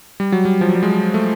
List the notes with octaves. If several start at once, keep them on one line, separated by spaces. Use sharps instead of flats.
G3
F#3
G3
F3
F#3
G3
G#3
A3